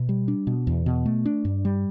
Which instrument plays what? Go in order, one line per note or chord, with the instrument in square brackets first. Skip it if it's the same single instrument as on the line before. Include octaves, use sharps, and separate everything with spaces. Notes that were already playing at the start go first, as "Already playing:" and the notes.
Already playing: [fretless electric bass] B2
G3
D4
B2
E2
B2
A3
D4
G2
G3